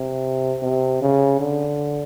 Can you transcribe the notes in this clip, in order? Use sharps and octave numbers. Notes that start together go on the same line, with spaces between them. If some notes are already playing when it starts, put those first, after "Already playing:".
Already playing: C3
C3
C#3
D3